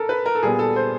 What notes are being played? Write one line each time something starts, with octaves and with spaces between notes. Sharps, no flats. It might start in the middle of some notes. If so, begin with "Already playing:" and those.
Already playing: A4 A#4
B4
A#4
A4
A#2 G3 B3 G#4
A4
C5